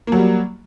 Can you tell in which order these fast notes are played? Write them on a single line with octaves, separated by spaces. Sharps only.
A#3 F#3 G3